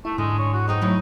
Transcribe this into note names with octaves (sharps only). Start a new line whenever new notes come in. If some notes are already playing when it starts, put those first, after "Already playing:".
A3 E4
G#2 D3 G#3
C#5
F#4
D#4 G#4 C5 G5
F#3 A3 E4